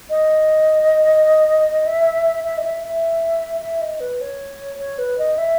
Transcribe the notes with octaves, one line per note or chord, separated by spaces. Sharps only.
D#5
E5
E5
D#5
E5
E5
E5
D#5
B4
C#5
C#5
B4
D#5
E5